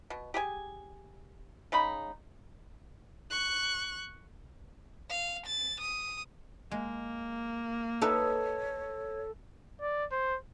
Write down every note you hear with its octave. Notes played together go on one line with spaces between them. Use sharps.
B2
G4 G#4 G#5
C#3 G#3 D#4 B5
C#6 F#6
F5
A6
D#6
G#3 A#3
D#4 A4 B4 C#5 E5
D5
C5